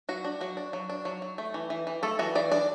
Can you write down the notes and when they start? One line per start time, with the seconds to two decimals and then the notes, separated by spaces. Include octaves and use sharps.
0.09 F#3 F#4
0.25 D4
0.41 F#3 F#4
0.57 D4
0.73 F#3
0.89 D4
1.05 F#3
1.22 F#3
1.38 A3
1.54 E3
1.70 E3
1.87 E3
2.03 A3 A4
2.19 E3 F#4
2.35 E3 D5
2.52 D4 D5